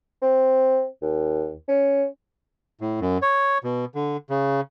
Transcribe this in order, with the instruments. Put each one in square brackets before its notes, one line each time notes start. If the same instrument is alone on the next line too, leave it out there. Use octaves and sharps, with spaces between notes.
[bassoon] C4
D#2
C#4
[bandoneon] A2
F#2
C#5
B2
D3
C#3